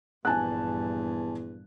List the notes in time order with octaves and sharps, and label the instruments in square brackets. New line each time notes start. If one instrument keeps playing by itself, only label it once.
[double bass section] A#1 G2 [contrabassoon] E2 [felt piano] G#5 A5 F#6